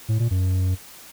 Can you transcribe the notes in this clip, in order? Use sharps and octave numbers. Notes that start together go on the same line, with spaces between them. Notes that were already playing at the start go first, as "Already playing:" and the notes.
A2
A#2
F#2